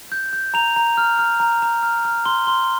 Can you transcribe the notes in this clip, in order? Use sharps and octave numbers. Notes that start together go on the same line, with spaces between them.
G6
G6
A#5 F7
A#5
F6
F6
A#5
A#5
F6
F6
C6 G7
C6 G7